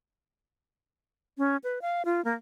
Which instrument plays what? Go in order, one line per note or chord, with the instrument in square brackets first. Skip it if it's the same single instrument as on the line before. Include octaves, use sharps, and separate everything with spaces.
[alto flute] C#4
B4
F5
F4
A#3